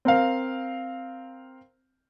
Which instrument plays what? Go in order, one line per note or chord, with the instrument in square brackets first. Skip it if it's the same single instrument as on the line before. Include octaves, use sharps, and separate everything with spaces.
[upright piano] C4 A#4 F5